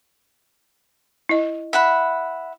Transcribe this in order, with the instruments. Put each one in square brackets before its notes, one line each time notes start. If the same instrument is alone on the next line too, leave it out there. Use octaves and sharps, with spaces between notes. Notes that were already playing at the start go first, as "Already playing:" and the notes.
[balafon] E4 D#5
[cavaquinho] E5 F#5 B5